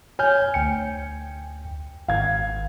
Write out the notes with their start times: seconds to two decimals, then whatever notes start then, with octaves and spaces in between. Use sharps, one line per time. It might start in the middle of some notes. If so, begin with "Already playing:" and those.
0.19 C#5 G#5 F6 G6
0.54 D2 G5 C#7
2.08 G#1 F5 G#6